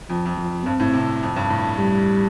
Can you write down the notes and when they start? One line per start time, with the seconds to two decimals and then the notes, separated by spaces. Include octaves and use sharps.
0.09 F2 F3
0.25 F2
0.38 F3
0.65 G2 C4
0.80 A2
0.93 C3
1.23 F2
1.36 G2
1.50 A2
1.78 G3